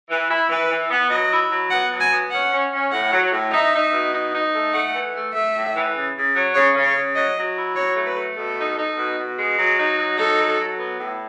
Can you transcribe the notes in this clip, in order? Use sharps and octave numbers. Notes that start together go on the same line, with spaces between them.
E3
E4
E3 B4
E3
B3
F#3 D#5
E4
F#3
B3 F#5
F#3
G#5
B3
C#4 F#5
C#4
C#4
A2 F#5
F#3
A2
D#4 E5
D#4
B2
D#4
D#4
A3
A3 F#5
E3
A3
A3 E5
A2
E3
C#3
C#3
F#3
C#3 C#5
C#3
C#5
C#3
F#3 D#5
F#3
E4
F#3 C#5
A3
B4
A3
B2 A4
D#4
D#4
B2
B2
G#3
F#3
D#4
F#3
D#4 A4
F#3
F#3
B3
A2